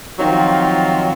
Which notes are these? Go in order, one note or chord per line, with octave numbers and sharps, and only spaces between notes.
D#3 F3 F#3 C4 F4